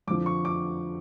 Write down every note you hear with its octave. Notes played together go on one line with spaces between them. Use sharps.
F2 D3 F3 D6
C#6
D6